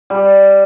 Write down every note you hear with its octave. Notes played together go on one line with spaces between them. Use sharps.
G3